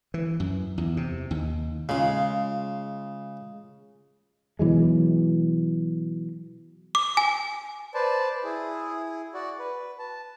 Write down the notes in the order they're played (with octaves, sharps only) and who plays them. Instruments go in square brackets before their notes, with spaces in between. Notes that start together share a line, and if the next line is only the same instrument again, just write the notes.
[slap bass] E3
F#2
E2
C3
D#2
[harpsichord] C#3 [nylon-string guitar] G#3 F4
[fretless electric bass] B2 E3 F#3 G#3
[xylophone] D6
G#5
[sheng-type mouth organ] B4 C5 D5 A5
E4 G#4
F#4 D5
B4
A5